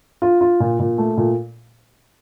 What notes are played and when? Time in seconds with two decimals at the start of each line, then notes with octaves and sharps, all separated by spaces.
0.22 F4
0.41 F4
0.60 A#2
0.79 A#2
0.98 A3
1.17 A#2